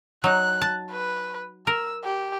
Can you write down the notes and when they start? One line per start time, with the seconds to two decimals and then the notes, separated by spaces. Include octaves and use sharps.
0.24 F#3 D#4 F#6
0.62 A5
0.91 B4
1.67 A#4 E6
2.04 G4